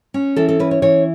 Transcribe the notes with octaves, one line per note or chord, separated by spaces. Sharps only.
C#4
E3 A4
A4
C#4 B4
C#5
E3 C#5